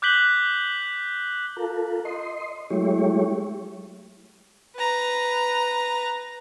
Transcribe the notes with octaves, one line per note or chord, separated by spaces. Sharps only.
D6 F#6 G6 B6 F#7 G7
F4 A4 A#4
D#5 C6
F#3 G#3 A3 E4 G4 C#5
B4 A#5